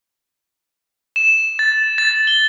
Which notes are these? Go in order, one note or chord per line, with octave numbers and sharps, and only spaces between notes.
E7
A6
A6
G7